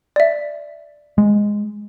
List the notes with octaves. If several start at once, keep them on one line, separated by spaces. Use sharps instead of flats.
D5 E5
G#3